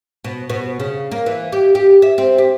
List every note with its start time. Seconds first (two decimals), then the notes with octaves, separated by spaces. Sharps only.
0.24 B2
0.50 B2
0.80 C#3
1.11 A#3
1.26 E3
1.52 G4
1.75 G4
2.02 E5
2.18 C4
2.38 G4